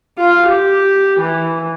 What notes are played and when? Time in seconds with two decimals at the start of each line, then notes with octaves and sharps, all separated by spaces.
0.18 F4
0.47 G4
1.19 E3